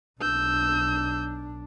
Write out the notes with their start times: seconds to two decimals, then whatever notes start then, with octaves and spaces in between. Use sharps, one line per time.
0.21 B1 D4 E6 G6